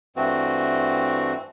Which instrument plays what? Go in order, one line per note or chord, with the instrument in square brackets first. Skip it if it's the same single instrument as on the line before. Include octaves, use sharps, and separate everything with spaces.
[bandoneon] G2 E3 A3 C4 F#4